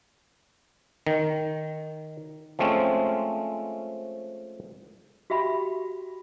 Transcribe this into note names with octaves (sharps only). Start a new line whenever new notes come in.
D#3
F3 G#3 A3 C4 C#4
F#4 G4 E5 G5 B5